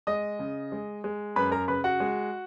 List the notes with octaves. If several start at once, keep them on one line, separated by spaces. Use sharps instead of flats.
G#3 D#5 D#6
C#3
G#3
G#3
F#2 B4 B5
A#4 A#5
C#3 B4 B5
F#4 F#5
G#3